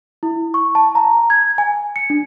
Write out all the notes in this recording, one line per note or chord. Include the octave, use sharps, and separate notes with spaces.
E4
C#6
A5
A#5
G#6
G#5
C#7
D4